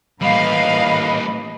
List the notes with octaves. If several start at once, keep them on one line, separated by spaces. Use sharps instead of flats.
A2 E3 G3 A#3 B4 D#5 F5